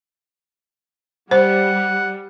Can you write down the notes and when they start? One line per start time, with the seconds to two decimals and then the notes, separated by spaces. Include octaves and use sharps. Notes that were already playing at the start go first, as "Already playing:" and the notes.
1.31 G3 C5 F#5